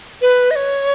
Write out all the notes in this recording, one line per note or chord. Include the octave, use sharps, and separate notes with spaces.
B4
D#5
C#5